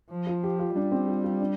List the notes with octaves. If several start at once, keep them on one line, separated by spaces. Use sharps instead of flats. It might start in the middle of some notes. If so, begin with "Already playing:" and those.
F3
F4
G4
F4
G3 D4
C4
F4
F4
D4